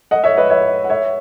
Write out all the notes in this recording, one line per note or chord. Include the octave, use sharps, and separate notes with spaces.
D#5 F#5
C#5 E5
B4 D#5
C#5 E5
F#5
C#5 E5